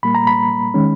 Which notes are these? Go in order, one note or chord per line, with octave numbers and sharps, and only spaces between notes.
A#2 G3 A#3 B5
A#5
B5
D#3 G#3 C#4